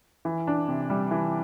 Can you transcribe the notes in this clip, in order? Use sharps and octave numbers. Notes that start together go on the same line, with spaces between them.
E3
D4
C3
G3
E3